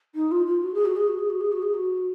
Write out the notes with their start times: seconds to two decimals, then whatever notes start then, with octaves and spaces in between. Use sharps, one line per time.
0.15 D#4
0.32 F4
0.46 F4
0.63 F#4
0.74 G#4
0.85 F#4
0.96 G#4
1.08 F#4
1.19 G#4
1.30 F#4
1.41 G#4
1.52 F#4
1.62 G#4
1.74 F#4